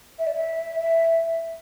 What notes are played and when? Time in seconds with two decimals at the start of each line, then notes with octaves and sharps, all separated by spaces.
0.19 E5
0.27 D5
0.35 E5
0.80 E5